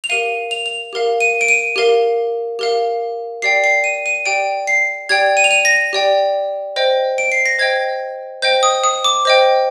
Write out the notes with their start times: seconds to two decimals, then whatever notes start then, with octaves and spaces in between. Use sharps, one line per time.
0.04 F7
0.10 G4 A#4 F5 D#7
0.51 F7
0.66 F7
0.93 G4 A#4 F5
1.20 D#7
1.41 D7
1.48 D#7
1.76 G4 A#4 F5
2.59 G4 A#4 F5
3.42 G4 D5 G5 C7
3.64 C7
3.84 D#7
4.06 D#7
4.26 G4 D5 G5 D7
4.67 C7
5.09 G4 D5 G5 G#6
5.37 D#7
5.44 F7
5.51 D#7
5.65 A#6
5.93 G4 D5 G5
6.76 C5 D#5 G5
7.18 D7
7.32 C7
7.46 A#6
7.59 C5 D#5 G5 G#6
8.42 C5 D#5 G5 G6
8.63 D#6
8.84 D#6
9.04 D6
9.25 C5 D#5 G5